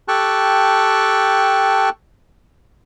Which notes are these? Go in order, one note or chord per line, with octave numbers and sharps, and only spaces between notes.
G4 A4 G5 A5 C#6 F#6